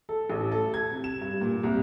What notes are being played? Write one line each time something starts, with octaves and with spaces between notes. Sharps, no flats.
A4
A1
A4
G#6
C3
E7
G2
A#2
C2